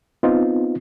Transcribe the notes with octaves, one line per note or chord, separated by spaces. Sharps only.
B3 C4 D#4 F4